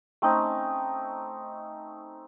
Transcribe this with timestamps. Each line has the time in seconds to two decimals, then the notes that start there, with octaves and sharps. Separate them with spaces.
0.22 A3 C4 C#4 D#4